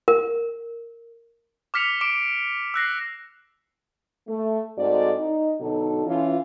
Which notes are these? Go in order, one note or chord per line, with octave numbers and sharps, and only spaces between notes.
A#4
D6 F6 B6 C#7 F7
D6 D7 E7
E6 F#6 A#6 C7
A3
G#2 C4 F#4 A4 D5
D#4
B2 D3 F#3 D#4 A4
E3 C#4 F4